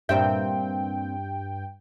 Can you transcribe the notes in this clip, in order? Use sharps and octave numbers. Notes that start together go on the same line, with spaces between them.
G2 A#2 C4 E5 G5